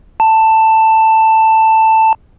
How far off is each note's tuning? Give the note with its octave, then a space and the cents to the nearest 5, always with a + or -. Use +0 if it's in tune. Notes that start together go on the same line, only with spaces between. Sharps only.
A5 +10